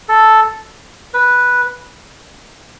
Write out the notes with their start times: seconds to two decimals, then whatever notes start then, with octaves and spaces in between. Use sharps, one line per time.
0.09 A4
1.14 B4